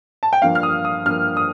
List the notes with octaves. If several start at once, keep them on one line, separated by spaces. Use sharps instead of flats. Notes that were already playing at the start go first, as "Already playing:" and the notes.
A5
G5
G2 F3 A#3 F5
F6
D#6
D#6
G2 F3 A#3 F6
D#6